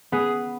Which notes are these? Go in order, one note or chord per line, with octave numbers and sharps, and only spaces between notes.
B3 G#4